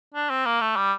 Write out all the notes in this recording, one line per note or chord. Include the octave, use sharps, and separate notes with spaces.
D4
C4
A#3
A3
G3